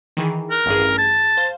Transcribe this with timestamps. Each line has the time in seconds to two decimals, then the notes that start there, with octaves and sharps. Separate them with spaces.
0.17 D#3 E3 G#4
0.51 A#4 F#6
0.66 A1 G2 G#4
0.98 A5 G#6
1.37 C5 F5